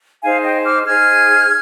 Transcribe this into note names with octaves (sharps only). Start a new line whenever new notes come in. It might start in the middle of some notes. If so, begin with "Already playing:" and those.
D#4 G#4 C5 F5 G#5
D#5 G5
D6 F6
D#4 G#4 C5 F6 G#6